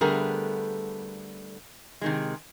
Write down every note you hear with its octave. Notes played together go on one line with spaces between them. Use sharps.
D3 G3 A3 B3 G#4 A#4
C3 D#3 G#3